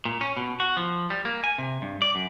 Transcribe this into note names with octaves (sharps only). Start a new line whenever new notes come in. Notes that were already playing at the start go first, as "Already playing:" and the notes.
A#2
C#4
B2
F#4
F3
G3
A#3
G#5
C3
G2
D5
F#2